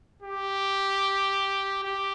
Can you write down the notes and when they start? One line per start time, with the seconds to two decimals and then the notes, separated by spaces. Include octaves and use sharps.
0.23 G4
1.84 G4